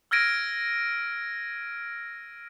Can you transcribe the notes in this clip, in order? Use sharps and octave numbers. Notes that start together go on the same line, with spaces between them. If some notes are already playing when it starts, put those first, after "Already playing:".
E6 F6 G#6 A#6 D7 D#7